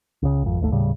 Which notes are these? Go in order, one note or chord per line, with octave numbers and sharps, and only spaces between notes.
C#2 C#3
G#1 F2
D1 G#1 D#2 A3
D#1 A2 C#3 G3